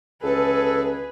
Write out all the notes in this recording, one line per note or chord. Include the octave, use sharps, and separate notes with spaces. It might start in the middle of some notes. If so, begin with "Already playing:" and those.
C#2 G#4 A4 B4